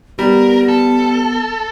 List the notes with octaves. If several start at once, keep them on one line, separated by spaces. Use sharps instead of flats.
G3 B3 A#4
A4